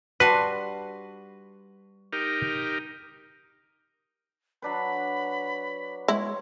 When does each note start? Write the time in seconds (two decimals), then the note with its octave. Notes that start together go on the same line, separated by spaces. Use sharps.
0.20 G3 D4 F#4 B4 A5 C6
2.13 D#4 G4 A#4
4.62 F#3 D4 B4 B5
6.08 G#3 E4 C#5 C6